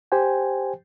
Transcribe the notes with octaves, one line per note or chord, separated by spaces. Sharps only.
G4 C5 G5 G#5